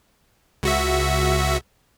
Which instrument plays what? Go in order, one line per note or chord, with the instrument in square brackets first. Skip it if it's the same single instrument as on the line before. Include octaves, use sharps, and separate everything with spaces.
[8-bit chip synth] C#2 F#4 E5